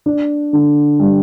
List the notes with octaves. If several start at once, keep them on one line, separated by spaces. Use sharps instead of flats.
D4
D3
G3